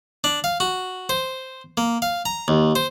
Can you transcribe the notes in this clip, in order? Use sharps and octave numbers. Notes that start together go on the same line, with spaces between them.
D4
F5
F#4
C5
A#3
F5
A#5
D#2
C5